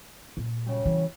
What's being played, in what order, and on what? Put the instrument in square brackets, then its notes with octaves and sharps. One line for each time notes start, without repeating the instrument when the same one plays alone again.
[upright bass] A#2
[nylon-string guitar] F#2 C#3 G3
[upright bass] E3